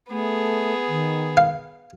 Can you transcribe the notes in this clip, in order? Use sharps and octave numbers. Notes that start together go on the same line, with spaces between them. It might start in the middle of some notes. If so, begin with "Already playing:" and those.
A3 B3 G#4
D#3
F5